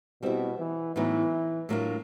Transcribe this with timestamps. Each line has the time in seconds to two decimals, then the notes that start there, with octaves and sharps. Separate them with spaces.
0.22 B2 G3 C4 E4
0.59 E3
0.96 A2 E3 F#3 B3 D#4
1.69 A2 F#3 A#3 D4 F4